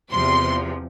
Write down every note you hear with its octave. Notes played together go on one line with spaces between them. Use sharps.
E2 C3 F3 C6